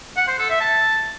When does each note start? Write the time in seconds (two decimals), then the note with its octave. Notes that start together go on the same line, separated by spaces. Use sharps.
0.17 F#5
0.28 C5
0.39 A4
0.50 E5
0.61 A5